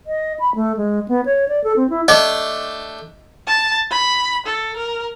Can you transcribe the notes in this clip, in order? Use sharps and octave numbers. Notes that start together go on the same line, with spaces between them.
D#5
B5
A3
G#3
B3
C#5
D5
A4
C4
E4
A3 D4 G4 D#5
A5
B5
A4
A#4